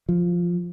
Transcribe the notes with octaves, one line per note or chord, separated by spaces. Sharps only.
F3